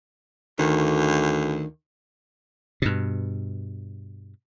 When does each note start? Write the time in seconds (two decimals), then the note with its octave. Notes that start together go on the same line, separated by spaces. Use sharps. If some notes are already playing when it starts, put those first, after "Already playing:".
0.59 D2 D#3
2.82 G2 B2